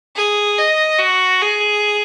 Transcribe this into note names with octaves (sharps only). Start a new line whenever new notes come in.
G#4
D#5
F#4
G#4